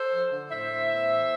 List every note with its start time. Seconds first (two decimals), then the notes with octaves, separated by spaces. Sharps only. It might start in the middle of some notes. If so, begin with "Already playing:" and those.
Already playing: A4 C5
0.11 F3
0.31 D3
0.50 A2 C5 E5
0.70 A2
0.90 B3
1.09 E3